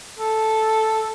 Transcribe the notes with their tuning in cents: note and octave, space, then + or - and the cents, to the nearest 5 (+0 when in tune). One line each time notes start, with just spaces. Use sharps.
A4 -5